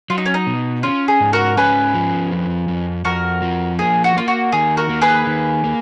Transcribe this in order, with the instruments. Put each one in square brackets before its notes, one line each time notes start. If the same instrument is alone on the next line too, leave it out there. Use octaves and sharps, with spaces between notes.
[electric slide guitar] F#3 [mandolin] F4
[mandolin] D#4
C#4
D#4
[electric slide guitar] B2
[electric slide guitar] C#4 [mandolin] F4
[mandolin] G#4
[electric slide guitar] G#2
[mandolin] F#4 A#4
[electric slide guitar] C#4 [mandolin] G#4 B4
[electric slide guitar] F3
F2
F2
[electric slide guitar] F2 [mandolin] F#4 A#4
[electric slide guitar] F3
[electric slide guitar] A#3 [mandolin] G#4
[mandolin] F#4
[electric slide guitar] A#3 [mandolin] F4
[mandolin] F#4
[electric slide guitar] D#3 [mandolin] G#4
[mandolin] F#4 A#4
[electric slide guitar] A#3
[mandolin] G#4 B4
[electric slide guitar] D#3
A#3